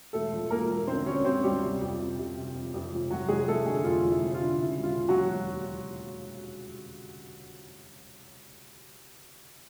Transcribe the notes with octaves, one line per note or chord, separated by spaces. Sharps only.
E1 A3 A4
F3
E1 A#3 A#4
E1
D3 C4 C5
D2 C#4 C#5
D2 C4 C5
D2 G3 G4
C3
F2
C3
C3
C3
F2
F2
F1
F1 F#3 F#4
F1 G#3 G#4
F1 A3 A4
D3 G#3 G#4
F2 F4
F1
E4
F1
F4
D3
C#3 E4
E1
F4
C#3
F#3 F#4
D#2
E1
D#2